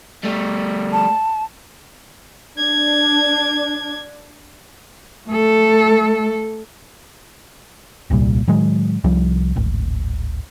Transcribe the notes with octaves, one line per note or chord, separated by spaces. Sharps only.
G3 A3
A5
D4 G#6
A3 A4
D#1 C2 A#2 G3
A2 D#3 F#3 G#3
C2 F3 G3
D1 G#1